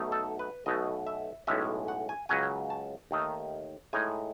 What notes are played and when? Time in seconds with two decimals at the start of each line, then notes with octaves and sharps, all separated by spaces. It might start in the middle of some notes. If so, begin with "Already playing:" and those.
Already playing: B1 B2 A3 D#4
0.12 A4
0.39 B4
0.66 B1 B2 A3 D#5
1.07 E5
1.47 B1 A2 G#3 C#4 E5
1.88 F#5
2.09 G#5
2.29 C#2 C#3 F#3 C#4 G#5
2.70 A5
3.11 D#2 D#3 A3 D#4
3.93 A2 G#3 D#4 G#5